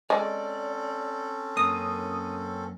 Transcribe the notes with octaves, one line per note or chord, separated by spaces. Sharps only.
G#3 C4 C#4 A4 D5
F#2 A#3 D#6